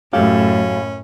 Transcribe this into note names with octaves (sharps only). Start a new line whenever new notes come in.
F#2 A2 F#3 A3 C#4 G4 F5